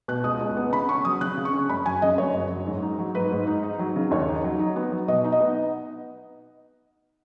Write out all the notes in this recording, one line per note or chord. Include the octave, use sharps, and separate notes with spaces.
B2 F#6
C#2 D#6
C#2
B3
C#3 B5
C#4 C#6
F#3 D#6
C#3 F#6
C#3
C#6
C#4
F#2 B5
F#3 G#5
C#3 D#5
F#2 C#5
F#2
F#3
G#2
D#4
F#3
G#2 B4
G#2
D#4
D#4
F#3
C#3
D#2 C#5
D#4
F#3
D#4
B3
F#3
B2 D#5
D#4
D#5
B3